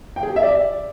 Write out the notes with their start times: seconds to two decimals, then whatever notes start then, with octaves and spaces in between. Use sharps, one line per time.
0.16 G5
0.23 G#4
0.30 G4
0.36 E5
0.43 D5